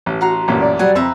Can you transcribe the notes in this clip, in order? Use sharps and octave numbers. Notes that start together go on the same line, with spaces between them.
A1
F#4 F#5 A#5 C6
A1 F#2 A#2
D5
F#3 G3 F#5 G#5
F2 B4 E5 A#5